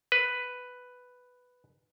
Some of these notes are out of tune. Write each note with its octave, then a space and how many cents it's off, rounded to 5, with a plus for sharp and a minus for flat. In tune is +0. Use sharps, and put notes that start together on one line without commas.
B4 +5